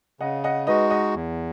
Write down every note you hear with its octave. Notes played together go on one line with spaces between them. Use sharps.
C#3 D#5 F#5
D#5 F#5
G#3 D#4 F#4 B4 D#5
D#5 F#5
E2